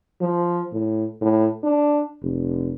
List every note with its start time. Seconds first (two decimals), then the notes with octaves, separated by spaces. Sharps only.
0.21 F3
0.73 A2
1.21 A2
1.63 D4
2.22 F1